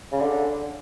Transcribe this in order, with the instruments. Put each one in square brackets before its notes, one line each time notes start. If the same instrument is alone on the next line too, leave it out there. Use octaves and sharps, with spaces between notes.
[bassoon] C#3
D3